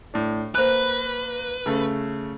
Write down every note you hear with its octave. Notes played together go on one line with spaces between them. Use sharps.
A2 D4
A#3 B4 C5 G#5 F#6
C#3 A3